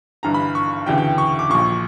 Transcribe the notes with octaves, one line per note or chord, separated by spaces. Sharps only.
G1 G2 E3 A#5
B5
C#6
E1 D2 C#3 E3 G5
G5
C#6
D6
A#1 A#2 C#6